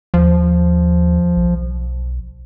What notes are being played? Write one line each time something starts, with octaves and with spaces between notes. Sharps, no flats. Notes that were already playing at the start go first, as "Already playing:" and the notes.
D#2 F3
B1